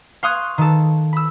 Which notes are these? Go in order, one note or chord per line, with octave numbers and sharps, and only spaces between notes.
F5 C6 C#6 D#6 F#6 G#6
D#3 A4
B5 E6